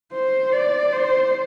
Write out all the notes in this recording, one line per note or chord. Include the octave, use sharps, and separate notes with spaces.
C5
D5
C5